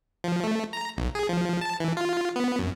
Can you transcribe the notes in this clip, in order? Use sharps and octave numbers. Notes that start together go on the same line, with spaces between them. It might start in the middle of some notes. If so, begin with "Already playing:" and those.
F3
A3
A#5
B1
G#4
F3
A5
E3
F4
B3
F#2